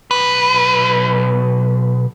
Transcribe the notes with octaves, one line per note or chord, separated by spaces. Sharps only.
B1 B4